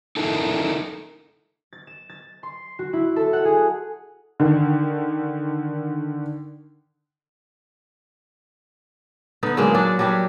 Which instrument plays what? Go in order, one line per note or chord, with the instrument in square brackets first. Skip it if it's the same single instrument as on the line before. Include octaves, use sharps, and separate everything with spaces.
[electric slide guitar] D#4 E4 A4 A#4
[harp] A6
E7
A6
C6
F#4
E4
A4
F#5
G#4
[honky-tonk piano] D3 D#3
[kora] D3 B3 D#4
F#3 G#3 A#3
F#3 D4
F#3 G3 D4 G4